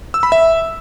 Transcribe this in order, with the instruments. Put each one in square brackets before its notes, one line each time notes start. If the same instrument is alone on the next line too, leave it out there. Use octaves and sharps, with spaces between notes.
[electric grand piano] E6
B5
E5